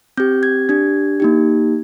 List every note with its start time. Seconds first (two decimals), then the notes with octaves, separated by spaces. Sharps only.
0.18 C4 G4 G6
0.43 G#6
0.69 D4 G4 G#6
1.20 A#3 D#4 G4